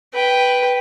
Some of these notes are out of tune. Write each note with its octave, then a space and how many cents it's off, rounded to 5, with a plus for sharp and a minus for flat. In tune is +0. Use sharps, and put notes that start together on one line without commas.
B4 +0 G5 +0